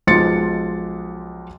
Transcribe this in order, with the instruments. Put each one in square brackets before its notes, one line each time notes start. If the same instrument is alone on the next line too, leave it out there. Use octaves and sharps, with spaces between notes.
[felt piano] B1 F3 G#3 C6 A6 C#7